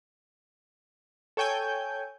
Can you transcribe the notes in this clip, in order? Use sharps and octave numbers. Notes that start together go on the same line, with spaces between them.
A4 C#5 G5 G#5 G6